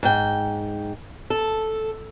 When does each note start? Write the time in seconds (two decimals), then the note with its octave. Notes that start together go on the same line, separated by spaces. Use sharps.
0.03 G#2 G5
1.30 A4